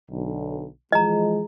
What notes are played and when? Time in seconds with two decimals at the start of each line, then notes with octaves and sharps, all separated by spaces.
0.10 B1 D3
0.92 E3 F3 G#3 D#5 A#5